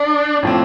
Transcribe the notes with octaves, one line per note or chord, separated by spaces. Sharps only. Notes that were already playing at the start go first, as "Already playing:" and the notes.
Already playing: D4
A2 F3 C4